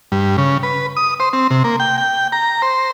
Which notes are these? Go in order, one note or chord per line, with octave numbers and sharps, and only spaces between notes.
G2
C#3
B4
D#6
C5
C4
C3
A#3
G5
G5
A#5
C5